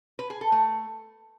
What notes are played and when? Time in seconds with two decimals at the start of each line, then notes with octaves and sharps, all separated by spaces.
0.19 B4
0.30 G#4
0.41 A4
0.52 A3